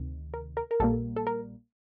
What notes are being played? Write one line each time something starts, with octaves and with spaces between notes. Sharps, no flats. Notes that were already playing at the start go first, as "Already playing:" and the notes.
Already playing: D2 C3 D#3
A#4
A#4
A#4
A#1 A#2 G3 A#3 A4
A4
A#4